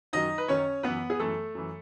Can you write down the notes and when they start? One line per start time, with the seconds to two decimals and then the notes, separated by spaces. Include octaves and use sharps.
0.13 F#2 D#3 F#3 D#4 D#5
0.38 B4
0.48 F#2 D#3 F#3 C#4 C#5
0.83 F#2 E3 B3 B4
1.10 G#4
1.19 F#2 E3 A3 A4
1.55 F#2 E3